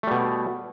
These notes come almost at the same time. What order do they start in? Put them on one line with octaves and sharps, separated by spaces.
A3 G3 B2